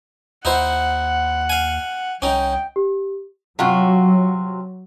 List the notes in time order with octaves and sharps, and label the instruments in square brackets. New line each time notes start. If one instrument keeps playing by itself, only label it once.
[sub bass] D#2 [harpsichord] D#4 E4 C5 [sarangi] F#5
[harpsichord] F5 G#5
[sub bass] C2 [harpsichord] C#4 D#4 [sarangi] G5
[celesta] G4
[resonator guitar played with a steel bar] C3 F4 F#4 [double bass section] F#3